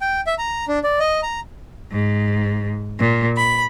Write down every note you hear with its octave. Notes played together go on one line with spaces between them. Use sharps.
G5
E5
A#5
D4
D5
D#5
A#5
G#2
A#2
B5